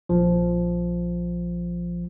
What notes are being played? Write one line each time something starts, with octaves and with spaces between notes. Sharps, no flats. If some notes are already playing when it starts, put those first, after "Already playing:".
A#1 F3